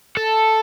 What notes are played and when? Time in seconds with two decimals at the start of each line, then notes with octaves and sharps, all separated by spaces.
0.17 A4